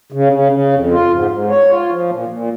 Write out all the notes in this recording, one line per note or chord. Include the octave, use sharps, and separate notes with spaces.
C#3
C#3
C#3
F2
F4
G#2
G#2
C#5
F4
F3
A#2
A#2